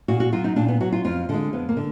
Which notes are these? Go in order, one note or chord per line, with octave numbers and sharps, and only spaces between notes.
A#2 F#4
F#4
F#3 F4
D#4
A#2 D4
B3
F#3 F#4
F4
F2 F4
D3 G#3
F2 B3
A#3
D3